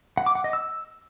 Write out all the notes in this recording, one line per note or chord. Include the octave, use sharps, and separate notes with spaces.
F#5
D6
F#5
D#5
E6